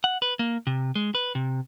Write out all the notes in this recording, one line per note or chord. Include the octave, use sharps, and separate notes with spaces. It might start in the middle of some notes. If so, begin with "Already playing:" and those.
F#5
B4
A#3
C3
G#3
B4
C3